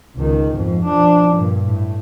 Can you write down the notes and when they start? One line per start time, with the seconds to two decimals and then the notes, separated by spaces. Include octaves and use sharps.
0.16 C#2 D#3
0.55 F2 G#2
0.84 F3 D4
1.34 G2 A#2
1.66 A2